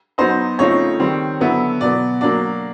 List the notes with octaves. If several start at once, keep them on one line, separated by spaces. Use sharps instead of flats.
F#3 B3 D#4 C5
C#3 F3 A3 C4 D#4 C#5
D#3 G3 C4
D3 F#3 B3 E4
B2 F#3 B3 D5
F#3 A#3 D4 D5